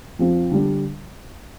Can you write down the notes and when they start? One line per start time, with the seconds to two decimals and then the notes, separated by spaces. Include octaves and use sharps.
0.19 F2 F3 C4
0.51 D3 G3 D4